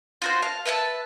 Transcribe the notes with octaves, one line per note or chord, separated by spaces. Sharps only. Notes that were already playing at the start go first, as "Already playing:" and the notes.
F4 F#4 C5
F5 A5
B4 E5 G#5 A5